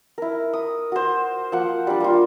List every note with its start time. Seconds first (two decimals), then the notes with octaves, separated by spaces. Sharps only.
0.18 E4 A#4
0.53 D#6
0.92 F#4 C5
1.52 F3 A#3 F#5
1.87 G3 D4
2.00 A#3 F4